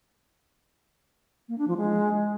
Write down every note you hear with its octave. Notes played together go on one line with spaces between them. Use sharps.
A#3
D4
F3
G#3